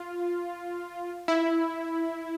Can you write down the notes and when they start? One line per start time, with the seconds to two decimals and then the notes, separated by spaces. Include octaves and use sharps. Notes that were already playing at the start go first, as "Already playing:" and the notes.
Already playing: F4
1.28 E4